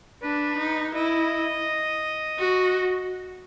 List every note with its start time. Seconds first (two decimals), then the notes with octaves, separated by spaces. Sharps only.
0.22 D4 B4
0.58 D#4
0.95 E4 D#5
2.39 F#4